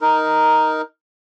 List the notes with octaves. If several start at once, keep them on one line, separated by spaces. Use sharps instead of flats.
D#4 A#4